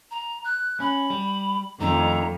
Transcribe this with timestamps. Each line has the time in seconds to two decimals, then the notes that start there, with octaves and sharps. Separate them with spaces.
0.11 A#5
0.45 F#6
0.80 C#4 B5
1.10 G3
1.80 F2 D#3 A3 D4 A#5